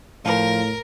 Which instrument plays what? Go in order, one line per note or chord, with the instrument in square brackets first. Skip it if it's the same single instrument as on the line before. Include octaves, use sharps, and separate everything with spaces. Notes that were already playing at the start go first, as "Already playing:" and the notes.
[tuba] A2 [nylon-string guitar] F3 F5 [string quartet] A#4